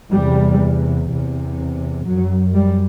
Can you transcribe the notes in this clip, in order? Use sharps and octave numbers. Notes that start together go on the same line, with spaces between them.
E2 C3 G3
E2 C3
F#2 F#3
G3